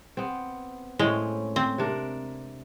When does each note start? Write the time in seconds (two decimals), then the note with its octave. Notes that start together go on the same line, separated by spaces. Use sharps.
0.17 B3 C4
0.99 A2 G#3 C4 C#4
1.56 C4
1.78 C3 D4 A#4